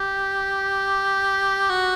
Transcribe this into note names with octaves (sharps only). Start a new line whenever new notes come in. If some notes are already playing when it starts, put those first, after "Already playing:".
Already playing: G4
F#4